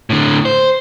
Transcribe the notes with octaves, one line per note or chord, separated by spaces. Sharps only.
A2 D3
C5